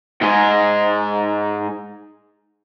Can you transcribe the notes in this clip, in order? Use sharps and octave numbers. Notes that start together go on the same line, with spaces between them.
G#2 G#3